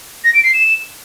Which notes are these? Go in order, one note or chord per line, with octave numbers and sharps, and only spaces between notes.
A#6
D7
C7
E7